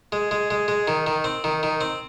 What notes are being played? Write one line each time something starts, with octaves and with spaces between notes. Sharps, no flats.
G#3
G#3
G#3
G#3
D#3
D#3
C4
D#3
D#3
C4